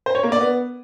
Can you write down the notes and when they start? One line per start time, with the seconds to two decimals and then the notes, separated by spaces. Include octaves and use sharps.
0.06 C5
0.15 C#5
0.23 A#3
0.32 D5
0.41 B3